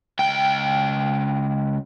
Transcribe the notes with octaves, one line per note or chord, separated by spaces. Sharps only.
C#2 G5